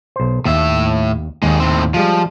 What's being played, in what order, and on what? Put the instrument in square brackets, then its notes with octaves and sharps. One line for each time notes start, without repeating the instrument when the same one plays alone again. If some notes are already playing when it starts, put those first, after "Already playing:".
[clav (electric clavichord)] B1 C5
[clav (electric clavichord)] D#2 [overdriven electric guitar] A2 E5
[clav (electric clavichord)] D#2 [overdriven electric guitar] D#3 G#3
[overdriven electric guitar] A2 C4
[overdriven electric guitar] F3 [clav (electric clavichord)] G3 G#3 F4